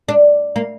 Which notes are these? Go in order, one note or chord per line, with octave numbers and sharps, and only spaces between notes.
D4
A#3